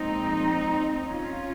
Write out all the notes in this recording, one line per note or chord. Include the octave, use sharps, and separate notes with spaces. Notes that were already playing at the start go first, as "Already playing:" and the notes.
Already playing: A#2 F3 G#3 C4 D#4
C#4 F4